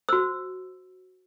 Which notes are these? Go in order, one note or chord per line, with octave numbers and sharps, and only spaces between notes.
F#4 C5 E6